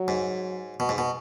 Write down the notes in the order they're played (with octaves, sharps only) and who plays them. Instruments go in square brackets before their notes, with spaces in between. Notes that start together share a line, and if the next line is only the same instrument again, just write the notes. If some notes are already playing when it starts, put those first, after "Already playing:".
Already playing: [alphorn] F#3
[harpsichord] G#2
B2
G#2
B2